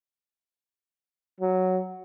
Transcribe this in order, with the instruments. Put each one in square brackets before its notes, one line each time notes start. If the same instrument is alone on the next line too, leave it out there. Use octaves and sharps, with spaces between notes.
[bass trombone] F#3